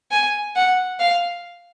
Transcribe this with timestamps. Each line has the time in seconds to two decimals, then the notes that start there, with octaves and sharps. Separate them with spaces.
0.12 G#5
0.56 F#5
1.00 F5